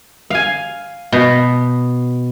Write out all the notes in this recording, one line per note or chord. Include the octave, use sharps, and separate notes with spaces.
F5 G#5
B2